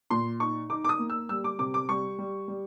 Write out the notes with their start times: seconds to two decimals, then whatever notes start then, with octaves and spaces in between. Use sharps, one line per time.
0.10 A#2 C6
0.40 D#4 C#6
0.70 D#4 D6
0.84 D6
0.89 D#6
0.99 A#3
1.10 E6
1.29 G3 E6
1.44 D6
1.59 C3 D6
1.74 D6
1.89 G3 C#6
2.18 G3
2.48 G3